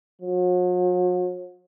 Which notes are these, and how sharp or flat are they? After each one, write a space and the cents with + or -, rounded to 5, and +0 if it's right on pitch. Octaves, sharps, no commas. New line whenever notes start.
F#3 -45